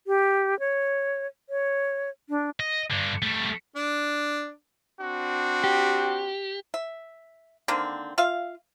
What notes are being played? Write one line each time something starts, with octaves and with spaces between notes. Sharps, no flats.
G4
C#5
C#5
D4
D#5
G2 D3
G3 A3
D4
C4 D4 F#4
G4
E5
D3 D#3 A#3 C4
F4 E5 F5